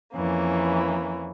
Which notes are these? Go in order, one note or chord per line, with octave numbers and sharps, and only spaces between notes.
F2 E3 A#3 C#4